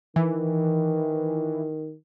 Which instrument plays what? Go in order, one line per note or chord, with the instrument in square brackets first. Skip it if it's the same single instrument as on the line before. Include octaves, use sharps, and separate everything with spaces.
[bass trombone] D#3 [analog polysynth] E3